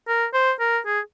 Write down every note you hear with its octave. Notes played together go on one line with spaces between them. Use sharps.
A#4
C5
A#4
G#4